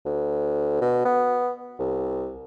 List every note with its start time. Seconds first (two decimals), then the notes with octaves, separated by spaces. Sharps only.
0.06 D2
0.81 B2
1.05 B3
1.79 C2